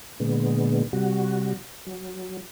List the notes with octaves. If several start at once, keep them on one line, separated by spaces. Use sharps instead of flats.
A#2 D3 G#3 B3
C3 G3 F#4
F#3